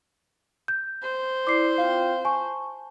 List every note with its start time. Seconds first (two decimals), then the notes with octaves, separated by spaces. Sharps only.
0.68 G6
1.03 C5
1.47 E4 D5 D6 C7
1.78 C4 F4 F5 G5
2.25 G#5 A5 C#6